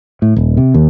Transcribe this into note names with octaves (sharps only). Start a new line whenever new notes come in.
A2
D#1
C3
D#2